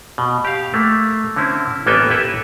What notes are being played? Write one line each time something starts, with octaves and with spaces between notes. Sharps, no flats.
B2
G4 F5
A3 A#3
D3 C4 C#4 E4
A1 A#3 B3 A4 G5 G#5
E4 G4 A4 B4 E5